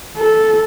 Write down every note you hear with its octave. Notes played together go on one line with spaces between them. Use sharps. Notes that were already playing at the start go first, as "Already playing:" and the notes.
A4